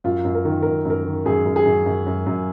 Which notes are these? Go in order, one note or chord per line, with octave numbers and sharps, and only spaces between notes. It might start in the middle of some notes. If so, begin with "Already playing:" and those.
F#2 F4
F#2
A#4
D#3
F#2 A#4
F#2 A#4
D#3
F#2 G#4
F#2
G#4
F#2
F#2
F#2
F#2